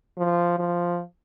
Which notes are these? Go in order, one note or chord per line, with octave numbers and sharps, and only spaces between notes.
F3
F3